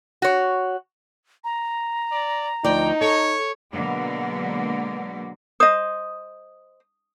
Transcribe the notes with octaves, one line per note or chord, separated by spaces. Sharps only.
F#4 C#5
A#5
D5
D2 F3 D#4 D5 G5
A4 C#5
B2 D3 F#3 G#3 A#3 B3
C5 D#5 D#6